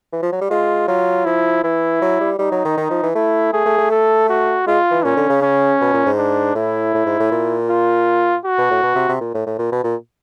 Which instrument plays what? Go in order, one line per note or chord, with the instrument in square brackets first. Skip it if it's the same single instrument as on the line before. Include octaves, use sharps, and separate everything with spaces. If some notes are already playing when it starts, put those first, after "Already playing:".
[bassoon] E3
F3
F#3
G3
[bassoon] G#3 [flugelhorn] F4
[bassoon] F#3 [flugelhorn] F4
[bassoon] F3 [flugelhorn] E4
[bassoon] E3 [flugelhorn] E4
[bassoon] F#3
G3
[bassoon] G3 [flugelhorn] D#4
[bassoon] F#3
D#3
D#3
F3
E3
[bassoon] A3 [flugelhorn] E4
[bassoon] A3 [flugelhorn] G#4
[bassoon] A3
A3
[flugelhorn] A4
F#4
[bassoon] G#3 [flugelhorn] F4
[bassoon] E3
[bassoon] A#2 [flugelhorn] C#4
[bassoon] D3
C#3
[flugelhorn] C#4
[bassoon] B2
A#2
G#2
[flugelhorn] D4
[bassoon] A2 [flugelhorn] E4
[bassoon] A2
G#2
A2
A#2
[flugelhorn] F4
F#4
[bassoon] B2
A2
B2
C3
C3
A#2
A2
A2
A#2
B2
A#2